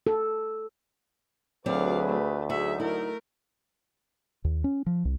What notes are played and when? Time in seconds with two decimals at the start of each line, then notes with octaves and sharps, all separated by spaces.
0.07 A4
1.66 D2 F#3 C4 F4 G#4 B4 D5 F5
2.07 A3
2.50 F#3 D#4 F#4 G#4 E5
2.80 A3 E4 A#4
4.44 D#2
4.64 C#4
4.86 F3
5.05 C2